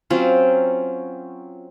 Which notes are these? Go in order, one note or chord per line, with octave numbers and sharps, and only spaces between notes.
F#3 C4 C#4 F4